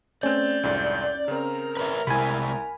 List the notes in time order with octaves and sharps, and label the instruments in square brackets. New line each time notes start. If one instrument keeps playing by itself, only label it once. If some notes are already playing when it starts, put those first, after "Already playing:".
[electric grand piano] A3 C4 [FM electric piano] C#4 [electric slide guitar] D5 [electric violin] G6
[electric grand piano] C2 F2 G#2
[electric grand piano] C#3 C4 [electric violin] A#4 A#5
[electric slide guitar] B4 C#5 E5
[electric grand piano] C2 [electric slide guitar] C3 G#3 E4 [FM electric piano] G#5 B5